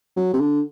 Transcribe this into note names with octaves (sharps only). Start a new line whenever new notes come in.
F#3
C3
D3